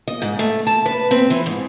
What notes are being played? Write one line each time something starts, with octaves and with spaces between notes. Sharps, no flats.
D#5
G#2
A3
A5
B4
C4
E3
G#2